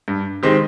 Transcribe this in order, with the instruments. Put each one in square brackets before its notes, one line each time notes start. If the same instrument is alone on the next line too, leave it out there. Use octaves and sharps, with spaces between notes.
[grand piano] G2
D#3 G#3 C4 G4